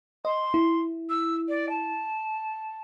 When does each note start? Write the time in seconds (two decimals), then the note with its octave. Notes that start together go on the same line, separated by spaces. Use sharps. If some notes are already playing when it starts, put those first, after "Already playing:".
0.25 D#5 C6
0.54 E4
1.09 E6
1.48 D5
1.69 A5